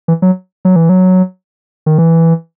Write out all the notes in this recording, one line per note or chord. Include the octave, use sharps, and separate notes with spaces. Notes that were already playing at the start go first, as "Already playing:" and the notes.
E3
F#3
F#3
E3
F#3
D#3
E3